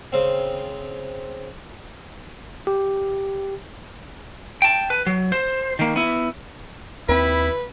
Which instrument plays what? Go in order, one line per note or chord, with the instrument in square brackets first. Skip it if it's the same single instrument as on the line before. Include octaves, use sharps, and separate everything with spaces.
[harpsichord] C#3 C4
[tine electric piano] G4
[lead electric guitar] G5 A5
B4
F#3
C5
D#3 A#3
B3 E4
[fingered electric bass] D#2 C4 [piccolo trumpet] E4 [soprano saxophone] B4